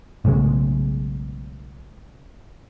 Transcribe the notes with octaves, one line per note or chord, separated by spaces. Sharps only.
B1 A2 C#3 G#3